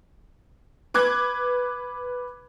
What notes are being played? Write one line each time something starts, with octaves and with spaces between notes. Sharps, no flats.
B4 D6 F#6 G#6